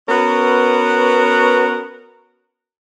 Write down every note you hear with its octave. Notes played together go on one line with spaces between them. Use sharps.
B3 C#4 F#4 A#4 B4